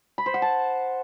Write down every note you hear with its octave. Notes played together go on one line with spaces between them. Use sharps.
B5
C5
F#5
A5